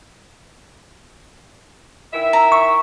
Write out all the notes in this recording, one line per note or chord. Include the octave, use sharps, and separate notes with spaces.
D#3 E4 E5
A#5
C#6